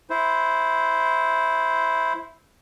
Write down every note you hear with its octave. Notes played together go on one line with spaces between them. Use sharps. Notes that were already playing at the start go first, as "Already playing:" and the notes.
E4 C5